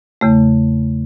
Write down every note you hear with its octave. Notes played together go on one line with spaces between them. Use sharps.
E2 C#3 A3